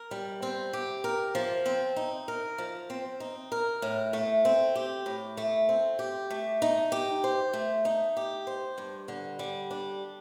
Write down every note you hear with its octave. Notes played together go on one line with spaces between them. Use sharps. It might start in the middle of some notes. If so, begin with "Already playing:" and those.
Already playing: A#4
G3
C4
G4
A#4
F3
C4
D#4
A#4
F3
C4
D#4
A#4
A2
A3
C4
G4
A2
A3
C4
G4
A3
D#4
G4
C5
A3
D#4
G4
C5
G2
D3
G3
D4